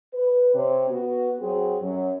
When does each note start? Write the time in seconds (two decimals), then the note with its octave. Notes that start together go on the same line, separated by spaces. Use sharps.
0.13 B4
0.53 C3 C4 C#5
0.89 B3 F#4
1.40 F#3 C4 F#4 G#4
1.82 F#2 F#3